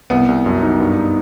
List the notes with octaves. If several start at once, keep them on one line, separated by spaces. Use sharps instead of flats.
C2 B3
C2
F#2
D#4
G2
D#4